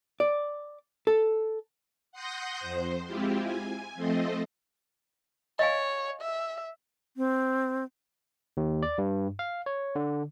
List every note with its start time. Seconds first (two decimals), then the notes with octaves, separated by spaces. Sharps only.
0.20 D5
1.07 A4
2.12 F#5 C6 D#6 G6 A#6
2.59 F2 C5
3.07 G#3 C4 E4 F4 G4
3.42 G#5
3.95 F3 A3 C4 A4 C5 D#5
5.59 C#5 D#5 F5 G#5
6.22 E5
7.17 C4
8.57 D#2
8.83 D5
8.98 G2
9.39 F5
9.66 C#5
9.95 D3